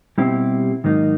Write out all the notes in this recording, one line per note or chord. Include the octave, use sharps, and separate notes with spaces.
B2 G3 C4 E4 G4
G#2 D#3 F#3 A#3 D#4